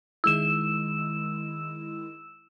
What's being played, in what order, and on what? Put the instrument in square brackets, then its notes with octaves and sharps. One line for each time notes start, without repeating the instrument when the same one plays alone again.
[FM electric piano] D#3 G#3 E4 [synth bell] E6 E7